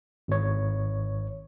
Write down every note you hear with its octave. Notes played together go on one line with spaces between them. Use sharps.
G#1 C#5